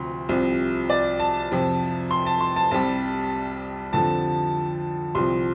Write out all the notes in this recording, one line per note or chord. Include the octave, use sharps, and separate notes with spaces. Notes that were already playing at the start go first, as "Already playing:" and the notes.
Already playing: D2 C3 F3 C6
C2 C3 F3
D5
A5
F2 C3 F3
C6
A5
C6
A5
C2 C3 G3 A5
F2 D3 F3 A5
C2 C3 F3 C6